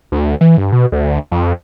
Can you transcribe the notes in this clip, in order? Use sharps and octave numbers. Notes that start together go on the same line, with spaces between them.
D2
E3
G2
B2
D2
F2